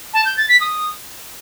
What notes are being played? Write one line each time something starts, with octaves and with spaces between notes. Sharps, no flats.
A5
G6
A6
B6
D#6